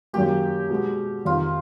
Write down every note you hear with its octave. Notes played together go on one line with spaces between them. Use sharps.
F#2 D#3 F#3 A#3 G4
B2 G#3 B3
F2 C3 D#3 F4